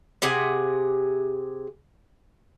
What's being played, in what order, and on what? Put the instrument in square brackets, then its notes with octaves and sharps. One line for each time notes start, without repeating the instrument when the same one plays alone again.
[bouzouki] C3 G4 G#4 F#5